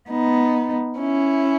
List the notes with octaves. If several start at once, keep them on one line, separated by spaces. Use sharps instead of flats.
B3 D#4
C#4 E4